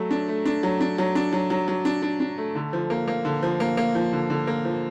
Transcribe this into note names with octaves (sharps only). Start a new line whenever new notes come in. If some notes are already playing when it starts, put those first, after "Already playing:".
Already playing: F#3 A3
D4
A3
D4
F#3
D4
F#3
D4
F#3
F#3
F#3
D4
D4
D4
A3
D3
F3
A#3
A#3
D3
F3
A#3
A#3
F3
D3
D3
A#3
F3